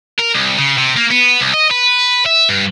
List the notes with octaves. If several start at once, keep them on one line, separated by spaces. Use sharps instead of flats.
A#4
C2
C#3
C3
A#3
B3
C2
D#5
B4
E5
G2